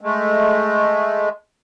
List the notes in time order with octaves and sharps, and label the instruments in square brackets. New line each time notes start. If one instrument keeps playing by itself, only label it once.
[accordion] G#3 A3